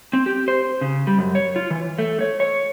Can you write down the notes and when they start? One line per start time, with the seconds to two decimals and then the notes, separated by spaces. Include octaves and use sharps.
0.13 C4
0.26 G4
0.48 C5
0.81 C#3
1.07 G3
1.18 F#2
1.35 C#5
1.56 F4
1.71 E3
1.98 A3
2.21 C#5
2.40 C#5